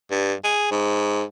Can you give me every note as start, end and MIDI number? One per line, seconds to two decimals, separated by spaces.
0.11 0.33 43
0.44 0.69 68
0.71 1.22 44